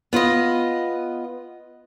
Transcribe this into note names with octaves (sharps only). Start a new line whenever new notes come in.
B3 F4 B4 D#5